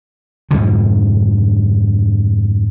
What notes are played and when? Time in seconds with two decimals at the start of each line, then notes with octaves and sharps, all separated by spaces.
0.51 F2 G#2 B2 D3